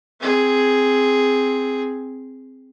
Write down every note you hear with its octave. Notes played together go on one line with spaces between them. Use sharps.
C4 G#4